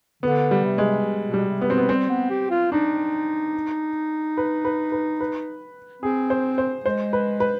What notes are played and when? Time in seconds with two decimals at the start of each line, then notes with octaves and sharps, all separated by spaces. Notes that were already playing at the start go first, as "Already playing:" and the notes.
0.23 D3 B3
0.51 G3
0.64 C3
0.78 G#3
1.26 B2
1.34 G3
1.48 C3
1.61 B3
1.67 B2 C4
1.78 B3
1.88 G3 C4
2.09 B3
2.30 G4
2.50 F4
2.72 D4 D#4
4.37 B4
4.65 B4
4.92 B4
5.20 B4
6.02 C4 G#4
6.30 C5
6.58 C5
6.85 G#3 C5
7.13 B4
7.40 B4